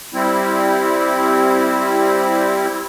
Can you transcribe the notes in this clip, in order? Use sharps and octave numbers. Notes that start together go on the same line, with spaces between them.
G3 C4 E4